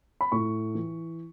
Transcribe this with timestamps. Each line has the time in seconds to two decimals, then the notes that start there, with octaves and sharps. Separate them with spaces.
0.21 B5
0.32 A2 C#6
0.75 E3